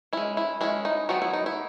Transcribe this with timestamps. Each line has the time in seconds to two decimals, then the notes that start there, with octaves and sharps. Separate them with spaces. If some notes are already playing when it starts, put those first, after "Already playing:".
0.13 G#3 C#4 E4
0.37 E4
0.61 G#3 C#4 E4
0.85 D#4
1.09 D#3 F#3 B3 F#4
1.22 E4
1.33 D#4
1.46 E4